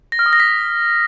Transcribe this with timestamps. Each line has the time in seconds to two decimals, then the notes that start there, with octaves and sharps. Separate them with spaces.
0.12 A#6
0.19 F6
0.26 D#6
0.33 A#6
0.40 B6